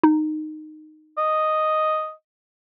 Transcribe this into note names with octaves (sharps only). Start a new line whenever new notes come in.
D#4
D#5